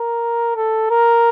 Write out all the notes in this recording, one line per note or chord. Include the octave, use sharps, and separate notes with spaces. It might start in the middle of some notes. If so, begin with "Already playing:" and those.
Already playing: A#4
A4
A#4